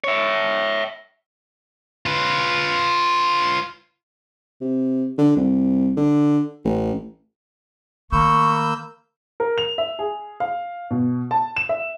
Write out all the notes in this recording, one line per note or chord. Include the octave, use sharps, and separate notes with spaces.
C#5 E5
F4 B4
C3
D3
C2
D3
A1
D#3 A3 A#3 B5 C#6 E6 G6
A#4
F7
E5
G#4
F5
B2
A5
E7
E5